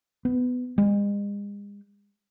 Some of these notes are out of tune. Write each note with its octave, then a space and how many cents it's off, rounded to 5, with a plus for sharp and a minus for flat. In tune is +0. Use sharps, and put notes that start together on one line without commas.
B3 +15
G#3 -40